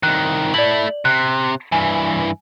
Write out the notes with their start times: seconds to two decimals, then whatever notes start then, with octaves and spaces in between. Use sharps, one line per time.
0.03 C2 D#3 F#6
0.54 A3 E4 D5 F#7
1.05 C3 F#6
1.72 G2 E3 G#5